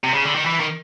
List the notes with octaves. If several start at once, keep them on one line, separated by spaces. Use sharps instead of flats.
C3
C#3
D3
D#3
E3
D#3